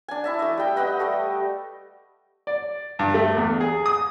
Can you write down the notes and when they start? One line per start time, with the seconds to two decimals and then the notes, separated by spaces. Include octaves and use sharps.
0.08 D4 G#5
0.24 E4 E5 A5
0.39 A3 D#5
0.57 G3 G5
0.76 B4 D#5 F#5 G5
0.99 G3 A3 A4
2.47 D5
2.99 G2
3.14 A3
3.37 E2
3.61 G#4
3.86 D#6